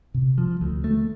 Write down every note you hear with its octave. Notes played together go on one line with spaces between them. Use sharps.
C3
F3
D2
A3